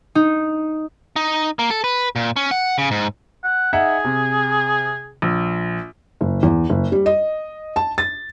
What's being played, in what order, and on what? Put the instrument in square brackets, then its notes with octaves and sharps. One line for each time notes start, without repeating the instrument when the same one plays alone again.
[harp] D#4
[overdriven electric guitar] D#4
A#3
A4
B4
A#2
C#4
F#5
C#3
G#2
[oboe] F#5
[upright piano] D#4 E5 F#5 [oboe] G#4
[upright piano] C3
A#1
[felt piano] F#1
E2
F#1
G3
D#5
A5
A6